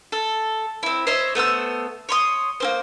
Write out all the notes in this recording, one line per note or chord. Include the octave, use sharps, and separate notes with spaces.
A4
C4 E4
C5 C#5 D#5 E5
A3 B3 C5 E6
C#5 C6 D#6
A#3 C4 C5